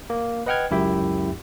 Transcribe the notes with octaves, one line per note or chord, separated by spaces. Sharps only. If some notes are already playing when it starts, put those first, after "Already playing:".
A#3
B4 D#5 F#5 G5 F6 G#6
C#2 F#2 E4 G4 E5 G5